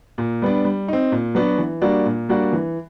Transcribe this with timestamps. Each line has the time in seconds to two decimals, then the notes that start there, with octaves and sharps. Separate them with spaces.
0.18 A#2
0.42 G3 B3 D4
0.65 G3
0.88 C4 D#4
1.12 A#2
1.35 F#3 B3 D4 F#4
1.58 E3
1.82 G3 A#3 D4 F#4
2.06 A#2
2.29 G3 A#3 D4 F#4
2.53 E3